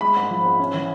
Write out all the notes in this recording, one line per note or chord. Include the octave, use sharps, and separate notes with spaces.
G#3 B5
G#2
F3
G#2
C#4
E3